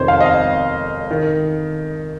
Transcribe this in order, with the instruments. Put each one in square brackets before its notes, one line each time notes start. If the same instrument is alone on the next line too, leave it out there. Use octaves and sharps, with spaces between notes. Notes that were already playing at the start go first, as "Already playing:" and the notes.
Already playing: [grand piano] F2 C3 D#3 C5 C#5
F5
D#5
F5
D#3